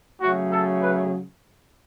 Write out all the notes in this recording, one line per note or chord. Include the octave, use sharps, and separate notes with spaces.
C#3 F#3 A3 F#4
A4
B4